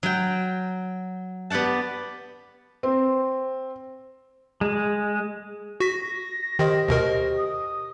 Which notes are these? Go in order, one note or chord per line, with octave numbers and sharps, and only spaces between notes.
F#3 G5
B3 G4 D5 F#5 A5
C4
G#3
F#4 A#6 B6
D#3 G4 C5 D#5
D2 B2 A#4
D#6